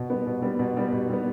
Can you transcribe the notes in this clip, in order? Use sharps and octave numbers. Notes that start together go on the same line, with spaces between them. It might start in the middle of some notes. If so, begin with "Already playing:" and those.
Already playing: B2
G3 B3
B2
G3 B3
B2
G3 B3
B2
G3 B3